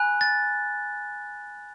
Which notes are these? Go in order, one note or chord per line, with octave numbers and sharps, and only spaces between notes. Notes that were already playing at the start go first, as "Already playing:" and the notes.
Already playing: G#5 B5 F#6
A6